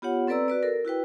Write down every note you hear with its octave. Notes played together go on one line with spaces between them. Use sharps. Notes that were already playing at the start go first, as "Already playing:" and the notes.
B3 F4 G4 C#5 F#5
C4 A4 B4 D5 A#5 E6
F#4 B4 D5
A4 A#4
E4 F#4 B4 G5